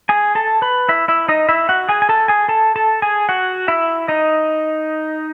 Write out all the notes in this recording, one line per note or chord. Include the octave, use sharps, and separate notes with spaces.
G#4 G#5
A4 A5
B4 B5
E4 E5
E4 E5
D#4 D#5
E4 E5
F#4 F#5
G#4 G#5
G#5
A4 A5
G#4 G#5
A4 A5
A4 A5
G#4 G#5
F#4 F#5
E4 E5
D#4 D#5